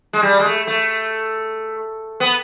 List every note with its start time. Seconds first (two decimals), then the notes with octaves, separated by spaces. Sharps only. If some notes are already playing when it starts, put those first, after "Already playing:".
0.13 G#3
0.23 G3
0.39 G#3
0.45 A3
0.67 A3
2.20 B3